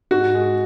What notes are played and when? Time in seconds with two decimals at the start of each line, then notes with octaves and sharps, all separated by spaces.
0.11 G#2 F#4
0.35 G#3